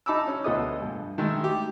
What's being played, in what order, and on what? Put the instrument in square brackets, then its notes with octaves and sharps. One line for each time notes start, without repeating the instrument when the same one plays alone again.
[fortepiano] D#4 A5 B5 D6 E6
C#4
D2 B3 F4 A4 D#5 D#6
G2
D#3 G#3 A3
G4